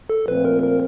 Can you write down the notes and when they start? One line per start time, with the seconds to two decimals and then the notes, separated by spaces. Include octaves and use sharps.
0.09 A4
0.28 A#2 F3 A3 C4 B4
0.45 A#4
0.63 A#4